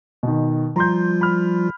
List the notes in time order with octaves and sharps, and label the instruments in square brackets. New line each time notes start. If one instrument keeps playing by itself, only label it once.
[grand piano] B2 D#3
[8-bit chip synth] F3 G3 F4 [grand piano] A#5 C6 G6
[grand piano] B5 F6